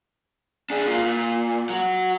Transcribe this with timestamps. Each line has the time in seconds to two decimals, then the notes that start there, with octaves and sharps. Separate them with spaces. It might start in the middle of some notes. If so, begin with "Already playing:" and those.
0.70 D4 G#4
0.87 A#3 F4
1.06 A#2
1.70 F#3 F#4